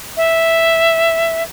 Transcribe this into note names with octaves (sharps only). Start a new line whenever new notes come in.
E5